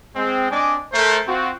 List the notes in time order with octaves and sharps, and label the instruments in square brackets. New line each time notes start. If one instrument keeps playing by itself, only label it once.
[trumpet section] G#3 C4
C4 D4 D5 D#5 G#5 D6
A3 A#4 C5
C4 F4 F#4